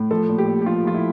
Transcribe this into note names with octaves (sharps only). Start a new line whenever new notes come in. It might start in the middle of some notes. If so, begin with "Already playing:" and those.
Already playing: A2
F3 A4
A#2
G4
A#2
G4
F3 F4
F3 F4
E4